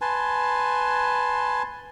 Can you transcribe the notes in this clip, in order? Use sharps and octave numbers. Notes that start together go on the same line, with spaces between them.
B4 G#5 A5 C6